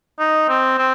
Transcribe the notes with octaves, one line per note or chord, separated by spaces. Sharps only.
D#4
C4
C4